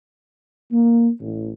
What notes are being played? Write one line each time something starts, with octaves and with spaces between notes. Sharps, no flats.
A#3
A1